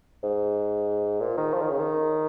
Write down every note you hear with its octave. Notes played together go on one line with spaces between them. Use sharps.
G#2
A#2
D#3
F3
D#3
C#3
D#3